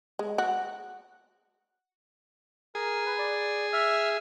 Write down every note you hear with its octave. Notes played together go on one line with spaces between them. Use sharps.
G#3
F#4
G#4 A#4
B4
D5
E5 E6 F6